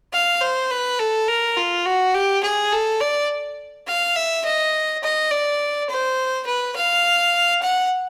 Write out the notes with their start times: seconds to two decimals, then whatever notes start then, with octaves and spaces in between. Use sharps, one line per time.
0.13 F5
0.41 C5
0.70 B4
0.99 A4
1.28 A#4
1.57 F4
1.85 F#4
2.14 G4
2.43 G#4
2.72 A4
3.01 D5
3.87 F5
4.16 E5
4.45 D#5
5.03 D#5
5.31 D5
5.89 C5
6.46 B4
6.76 F5
7.62 F#5